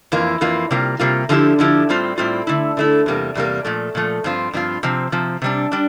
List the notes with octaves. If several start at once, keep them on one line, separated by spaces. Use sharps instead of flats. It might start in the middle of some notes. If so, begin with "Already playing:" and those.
F2 E3 A#3 F4
F2 E3 A#3 F4
C3 G3 A#3 F4
C3 G3 A#3 F4
D3 F3 A3 E4 G4
D3 F3 A3 E4 G4
A2 G3 C4 F4
A2 G3 C4 F4
D3 A3 E4
D3 A3 E4
E2 C3 G3 A#3
E2 C3 G3 A#3
A#2 F3 A3
A#2 F3 A3
G2 F3 C4 F4
G2 F3 C4 F4
C3 F3 C4
C3 F3 C4
C3 G3 D4
G3 D4